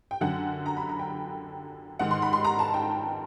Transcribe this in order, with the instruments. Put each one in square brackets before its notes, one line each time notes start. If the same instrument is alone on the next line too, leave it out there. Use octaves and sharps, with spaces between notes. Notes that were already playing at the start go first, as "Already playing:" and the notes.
[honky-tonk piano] G5
F#2 D3 F#5
A#5
B5
A#5
G5
G#2 D#3 F#5
C6
B5
C6
A#5
A5
G5